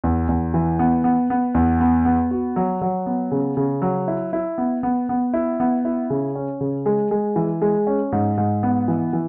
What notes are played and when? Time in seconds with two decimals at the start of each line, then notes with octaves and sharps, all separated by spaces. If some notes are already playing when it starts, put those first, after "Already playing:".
0.04 E2
0.29 E2
0.54 E3
0.79 B3
1.04 B3
1.30 B3
1.54 E2
1.80 B3
2.05 B3
2.31 F#4
2.56 F#3
2.82 F#3
3.06 B3
3.31 C#3
3.57 C#3
3.82 F#3
4.08 E4
4.33 E4
4.58 B3
4.83 B3
5.09 B3
5.33 E4
5.60 B3
5.85 E4
6.10 C#3
6.35 C#4
6.61 C#3
6.86 G#3
7.11 G#3
7.36 E3
7.62 G#3
7.87 C#4
8.12 G#2
8.38 G#2
8.63 B3
8.88 E3
9.13 E3